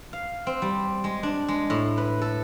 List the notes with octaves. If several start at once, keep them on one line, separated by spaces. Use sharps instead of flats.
F5
C4
G3
G#3
D4
G#3
A2
B4
A4